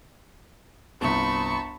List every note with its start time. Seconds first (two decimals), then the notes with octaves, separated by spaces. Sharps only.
1.01 G1 C2 A5 B5 C#6